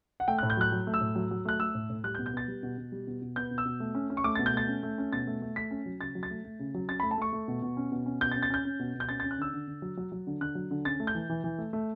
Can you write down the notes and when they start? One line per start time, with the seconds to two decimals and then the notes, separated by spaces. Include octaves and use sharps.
0.20 F#5
0.28 A3 G5
0.38 F#6
0.43 A2
0.50 G6
0.57 F#3 F#6
0.72 F#3
0.87 A3
0.94 E6
1.01 A2
1.16 F#3
1.31 F#3
1.45 A3 F#6
1.60 A3 E6
1.75 A2
1.90 A2
2.04 G3 F#6
2.15 G6
2.19 B2
2.26 G6
2.33 B3 A6
2.48 G3
2.63 B2
2.78 B2
2.92 G3
3.07 B2
3.21 B2
3.36 B3 G6
3.51 B2
3.58 E6
3.65 B2
3.80 A3
3.95 C#4
4.10 C#4
4.17 C#6
4.24 A3 D6
4.35 A6
4.39 B2
4.46 G6
4.54 A3 A6
4.68 C#4
4.83 A3
4.98 C#4
5.13 B2 A6
5.27 A3
5.42 A3
5.56 A3 B6
5.71 C#4
5.86 F#3
6.01 C#3 A6
6.15 F#3
6.23 A6
6.30 A3
6.44 A3
6.59 C#3
6.74 F#3
6.89 C#4 A6
7.00 B5
7.03 A3
7.11 A5
7.18 A3 C#6
7.33 A3
7.48 B2
7.62 B2
7.77 C#4
7.92 B2
8.06 C#4
8.21 B2 G6
8.32 A6
8.36 C#4
8.43 A6
8.50 C#4 G6
8.65 C#4
8.79 B2
8.95 B2
9.00 G6
9.09 C#4 A6
9.20 A6
9.24 C#4
9.31 F#6
9.38 D3 E6
9.53 D3
9.67 D3
9.82 F#3
9.97 F#3
10.12 F#3
10.27 D3
10.41 D3 F#6
10.55 F#3
10.71 D3
10.85 C#4 A6
11.00 A3
11.07 G6
11.15 E3
11.29 E3
11.44 E3
11.58 A3
11.73 A3